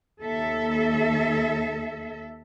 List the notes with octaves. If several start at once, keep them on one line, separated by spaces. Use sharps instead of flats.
D#2 A4 E5